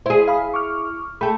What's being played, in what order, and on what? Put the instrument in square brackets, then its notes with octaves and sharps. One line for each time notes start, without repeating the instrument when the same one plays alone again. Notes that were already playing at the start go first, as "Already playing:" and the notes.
[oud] E4 G#4 [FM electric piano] C5
[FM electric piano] F5 B5 D#6
C#6 D6 F6
[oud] A3 A4 [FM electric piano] G#4 G5 B5